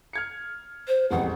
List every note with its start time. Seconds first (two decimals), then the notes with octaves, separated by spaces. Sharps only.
0.13 F6 G#6 C#7
0.88 C5
1.11 E1 A1 F2 F#5